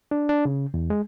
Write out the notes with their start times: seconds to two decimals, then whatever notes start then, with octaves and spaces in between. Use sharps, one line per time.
0.11 D4
0.29 D4
0.45 C#3
0.74 E2
0.90 G#3